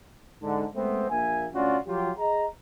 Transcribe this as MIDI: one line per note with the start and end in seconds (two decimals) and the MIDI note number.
0.42 0.65 44
0.42 0.65 50
0.75 1.06 56
0.75 1.06 57
0.75 1.06 59
0.75 1.06 60
1.09 1.45 34
1.09 1.45 58
1.09 1.45 76
1.09 1.45 80
1.53 1.77 38
1.53 1.77 61
1.53 1.77 65
1.53 1.77 66
1.53 1.77 74
1.87 2.10 53
1.87 2.10 54
1.87 2.10 65
1.87 2.10 67
2.17 2.45 68
2.17 2.45 75
2.17 2.45 82